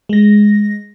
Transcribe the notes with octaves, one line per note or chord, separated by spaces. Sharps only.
G#3 A#6